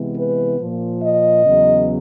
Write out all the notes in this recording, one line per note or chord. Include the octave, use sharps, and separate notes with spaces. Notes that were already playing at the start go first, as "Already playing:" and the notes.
Already playing: C3 E3 G#3 B3
B4
A#2 F3 A#3
D#5
E2 C#3 F#3 B3